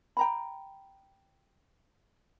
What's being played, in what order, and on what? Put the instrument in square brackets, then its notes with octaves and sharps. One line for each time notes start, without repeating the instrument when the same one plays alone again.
[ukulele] G5 A#5 B5